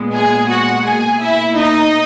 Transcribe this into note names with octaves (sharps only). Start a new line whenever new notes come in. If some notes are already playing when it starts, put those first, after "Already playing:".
Already playing: A#2 G#3 B3
G#4 G#5
F#4 F#5
B2 A#3 G#4 G#5
E4 E5
D#4 D#5